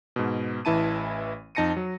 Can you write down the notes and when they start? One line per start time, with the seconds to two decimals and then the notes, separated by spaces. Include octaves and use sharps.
0.16 G#2 B2
0.65 A1 E3 E4 A5 D#7
1.55 F2 D#4 A5 A#6 C#7 D#7
1.77 F#3